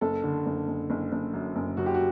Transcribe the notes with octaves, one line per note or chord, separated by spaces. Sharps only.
F#1 A4
D3
F#1
F#1
F#1
F#1
F#2
F#1
F#2 F#4
G4
F#4